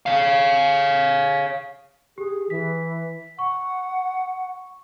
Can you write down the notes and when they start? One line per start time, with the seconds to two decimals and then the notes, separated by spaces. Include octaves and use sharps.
0.06 C#5 F5
2.18 G4 G#4
2.50 E3 B6
3.39 F#5 C#6